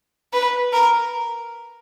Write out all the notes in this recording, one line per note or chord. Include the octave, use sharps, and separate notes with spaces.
B4
A#4